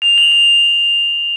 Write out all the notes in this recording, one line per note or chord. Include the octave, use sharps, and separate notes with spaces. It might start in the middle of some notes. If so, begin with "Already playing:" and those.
F7
F#7
F#7